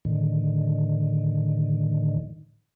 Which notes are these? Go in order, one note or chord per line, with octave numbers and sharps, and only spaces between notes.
A2 D3 D#3